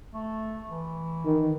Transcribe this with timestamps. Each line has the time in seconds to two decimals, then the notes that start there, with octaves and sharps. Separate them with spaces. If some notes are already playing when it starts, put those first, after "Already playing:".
0.13 A3
0.69 E3
1.25 D#3